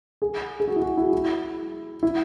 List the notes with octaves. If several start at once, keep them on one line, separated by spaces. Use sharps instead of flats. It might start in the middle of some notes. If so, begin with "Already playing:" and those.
G#4
G#4
F#4
E4
F#4
E4
E4
E4